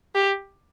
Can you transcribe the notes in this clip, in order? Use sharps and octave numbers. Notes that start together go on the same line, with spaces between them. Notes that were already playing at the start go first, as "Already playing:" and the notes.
G4